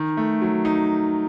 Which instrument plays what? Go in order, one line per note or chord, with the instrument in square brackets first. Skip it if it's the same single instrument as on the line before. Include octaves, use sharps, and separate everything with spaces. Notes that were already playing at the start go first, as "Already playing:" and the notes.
Already playing: [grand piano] D#3
A3
F#3
D#4